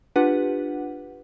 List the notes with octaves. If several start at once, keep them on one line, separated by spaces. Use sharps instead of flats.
D4 F4 G4 B4 F#5